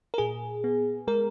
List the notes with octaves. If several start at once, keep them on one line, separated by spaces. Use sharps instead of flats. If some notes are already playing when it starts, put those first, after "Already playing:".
A#4
A#2 G#4
B3
G#3 A#4